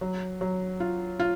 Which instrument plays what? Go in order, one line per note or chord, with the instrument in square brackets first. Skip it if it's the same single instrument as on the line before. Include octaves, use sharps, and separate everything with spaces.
[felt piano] F#3
F#3
F4
F4